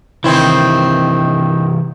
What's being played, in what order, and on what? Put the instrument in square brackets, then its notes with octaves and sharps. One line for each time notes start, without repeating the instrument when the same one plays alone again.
[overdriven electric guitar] C3 E3 [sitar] D#3 C4 E4